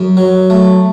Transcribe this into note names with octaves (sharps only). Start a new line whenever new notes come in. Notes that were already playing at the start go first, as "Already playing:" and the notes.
Already playing: F#2
F#3
A3